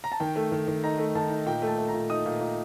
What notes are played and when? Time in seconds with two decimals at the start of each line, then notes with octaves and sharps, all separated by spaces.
0.04 A#5
0.12 A5
0.20 D#3 G5
0.36 A3
0.52 D#3
0.68 D#3
0.84 D#4 A#5
0.98 A3
1.15 D#3 A5
1.30 D#4
1.46 A#2 G5
1.62 A3
1.67 A5
1.78 A3
1.88 A#5
1.94 A#2
2.10 D#4 D#6
2.26 A#2
2.41 A#2